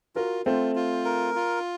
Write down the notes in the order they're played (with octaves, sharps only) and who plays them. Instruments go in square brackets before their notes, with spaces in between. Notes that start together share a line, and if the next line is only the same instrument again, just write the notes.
[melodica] F4 [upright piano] F#4 A#4
[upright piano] A3 C4 [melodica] F4
[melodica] F4
A#4
F4